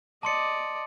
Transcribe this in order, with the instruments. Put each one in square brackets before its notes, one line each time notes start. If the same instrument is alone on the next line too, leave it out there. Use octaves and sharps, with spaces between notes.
[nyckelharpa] D5 D#5 [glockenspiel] A5 C6 C#7